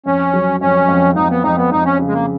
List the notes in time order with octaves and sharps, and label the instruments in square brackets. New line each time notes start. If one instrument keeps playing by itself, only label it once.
[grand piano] F2 [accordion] C#4
[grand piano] F#3
[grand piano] F2 [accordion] C#4
[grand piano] F2
[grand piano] F2 [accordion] D#4
[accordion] B3
[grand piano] F2 [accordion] D#4
[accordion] B3
[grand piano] F2 [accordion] D#4
[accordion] C#4
[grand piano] C#3
[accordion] G#3
A#3